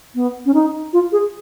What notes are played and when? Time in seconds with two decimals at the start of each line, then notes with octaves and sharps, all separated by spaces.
0.15 B3
0.46 C#4
0.54 D#4
0.93 F4
1.12 G#4